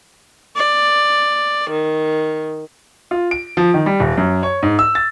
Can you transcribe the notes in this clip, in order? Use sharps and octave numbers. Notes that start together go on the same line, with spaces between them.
D5
D#3
F4
D7
F3
D#3
G3
D#1
F#2
C#5
G#2
E6
A6